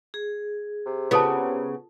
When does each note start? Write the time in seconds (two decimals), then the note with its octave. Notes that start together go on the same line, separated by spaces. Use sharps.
0.14 G#4
0.86 C3
1.11 C#3 B3 F4 A4 A5